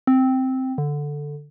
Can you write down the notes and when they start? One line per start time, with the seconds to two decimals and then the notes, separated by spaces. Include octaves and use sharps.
0.07 C4
0.78 D3